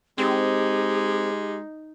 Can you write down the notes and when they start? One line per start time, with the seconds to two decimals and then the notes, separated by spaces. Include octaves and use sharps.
0.18 G#3 C4 D#4 G4